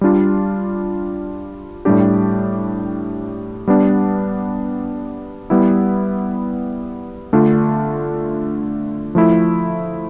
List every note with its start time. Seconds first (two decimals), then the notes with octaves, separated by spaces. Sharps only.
0.01 G3 D4 F4
1.85 A2 G3 D4 G4
3.67 G3 B3 D4
5.50 G3 B3 E4
7.33 D3 A3 D4 F4
9.15 F3 A3 E4